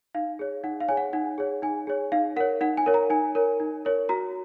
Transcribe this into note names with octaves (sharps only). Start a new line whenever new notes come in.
D#4 F5
G#4 C#5
D#4 F#5
F5
G#4 C#5 G#5
F#5
D#4 F#5
G#4 C#5
D#4 G#5
G#4 C#5
D#4 F5
A#4 C#5 F#5
D#4 F#5
G#5
A#4 C#5
A#5
D#4 G#5
A#4 C#5
D#4
A#4 C#5
F#4 A#5